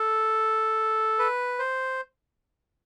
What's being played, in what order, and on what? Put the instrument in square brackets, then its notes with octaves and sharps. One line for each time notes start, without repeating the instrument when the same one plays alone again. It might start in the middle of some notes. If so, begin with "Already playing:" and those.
Already playing: [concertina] A4
B4
C5